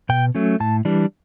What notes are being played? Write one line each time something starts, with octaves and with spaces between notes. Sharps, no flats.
B2 G5
F#3 A3 C#4
A2 A5
E3 G3 D4